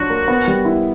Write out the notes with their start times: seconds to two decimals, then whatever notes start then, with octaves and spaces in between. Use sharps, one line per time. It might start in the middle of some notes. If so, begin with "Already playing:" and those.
Already playing: F#3 D4 F4 F#4
0.10 A#3
0.28 B3
0.48 G3
0.65 E4